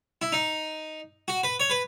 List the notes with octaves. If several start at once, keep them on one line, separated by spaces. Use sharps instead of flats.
E4
D#4
F#4
B4
C#5
B4